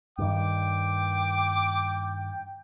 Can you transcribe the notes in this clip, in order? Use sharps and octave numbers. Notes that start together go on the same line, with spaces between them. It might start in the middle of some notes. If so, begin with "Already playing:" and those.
G2 D#3 G5 D6